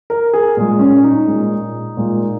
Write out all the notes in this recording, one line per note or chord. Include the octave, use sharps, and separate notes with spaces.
A#4
G#4
A#2 G#3
C#4
D#4
A#2 G#3
A#2 G#3